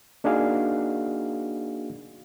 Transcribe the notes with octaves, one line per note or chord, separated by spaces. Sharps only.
A#3 D4 D#4 F#4 G#4 F5